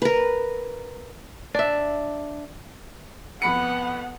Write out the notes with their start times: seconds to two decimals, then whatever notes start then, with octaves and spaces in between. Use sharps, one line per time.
0.02 A#4 B4
1.54 D4 E5
3.42 F2 B3 F#5 B5 C#7